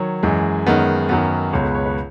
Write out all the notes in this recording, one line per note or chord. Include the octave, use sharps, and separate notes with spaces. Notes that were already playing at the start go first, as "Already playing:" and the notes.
Already playing: D#3 F#3 C#5
F#2 E3 G#3
F#2 D#3 G#3 B3
F#2 D#3 F#3 B3
C#2 B2 G#3 C#5
B4
C#5
B4